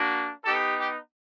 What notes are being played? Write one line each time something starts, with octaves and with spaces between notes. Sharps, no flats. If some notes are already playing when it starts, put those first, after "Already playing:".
Already playing: A#3 D4 F#4
B3 D#4 G4 A4
G4